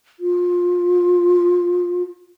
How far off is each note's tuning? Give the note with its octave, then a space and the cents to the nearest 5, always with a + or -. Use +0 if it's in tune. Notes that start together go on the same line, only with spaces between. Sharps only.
F4 +20